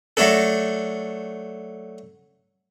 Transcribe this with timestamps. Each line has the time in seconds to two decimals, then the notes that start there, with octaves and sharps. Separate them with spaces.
0.17 F#3 A3 D4 A4